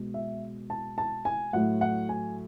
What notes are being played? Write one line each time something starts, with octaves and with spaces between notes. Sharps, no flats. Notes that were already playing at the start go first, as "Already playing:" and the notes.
Already playing: B2 G#3
E5
A5
A5
G#5
A2 F#3 A3 F#5
F#5
G#5